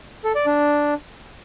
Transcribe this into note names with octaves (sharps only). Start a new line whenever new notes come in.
A4
D5
D4